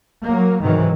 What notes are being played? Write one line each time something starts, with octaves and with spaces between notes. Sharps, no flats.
F#3 A#3
G#2 C3 D#3 E3 F#3